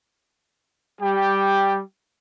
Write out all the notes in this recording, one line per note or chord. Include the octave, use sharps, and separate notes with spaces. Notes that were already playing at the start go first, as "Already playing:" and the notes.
G3 G4 G5